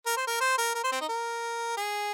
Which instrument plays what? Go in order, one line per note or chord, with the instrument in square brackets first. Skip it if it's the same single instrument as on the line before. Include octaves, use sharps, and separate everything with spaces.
[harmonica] A#4
C5
A#4
C5
A#4
A#4
C5
C4
D#4
A#4
G#4